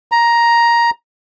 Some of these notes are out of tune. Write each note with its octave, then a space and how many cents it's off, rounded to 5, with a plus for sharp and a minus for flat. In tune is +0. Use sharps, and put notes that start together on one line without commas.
A#5 +10